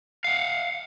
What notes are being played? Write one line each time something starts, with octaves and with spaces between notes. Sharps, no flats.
F5 F#5